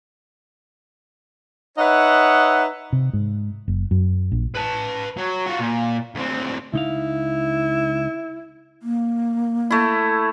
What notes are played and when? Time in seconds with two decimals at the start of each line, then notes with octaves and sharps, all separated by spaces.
1.78 D#4 B4 C#5 D#5 E5 F#5
2.93 C3
3.13 G#2
3.68 F#1
3.91 F#2
4.32 A#1
4.55 B4 A5
5.17 F#3
5.46 F4 F#4
5.59 A#2
6.15 D2 C4
6.73 C#2 D#4 E4 F5
8.83 A#3
9.71 A3 E4